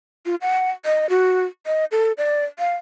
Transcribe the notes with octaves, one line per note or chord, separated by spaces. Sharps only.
F4
F#5
D#5
F#4
D#5
A4
D5
F5